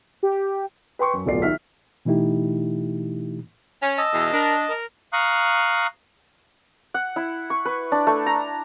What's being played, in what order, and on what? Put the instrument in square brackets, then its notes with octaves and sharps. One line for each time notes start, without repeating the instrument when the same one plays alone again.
[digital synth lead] G4
[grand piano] B4 G5 C6 C#6
F#2
D1 B1 A3 F4 D5 C7
D#3 E5 F6 B6
[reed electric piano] B2 E3 A3 D#4 E4 G4
[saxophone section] C#4
[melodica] D#5 A5 [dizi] E6
[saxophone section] E2 B2 E3
[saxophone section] D4 [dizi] A#4
[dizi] A#4
[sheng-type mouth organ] F5 A#5 C#6 D#6 F#6
[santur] F#5
E4
C#6
B4
D4
A3
A#5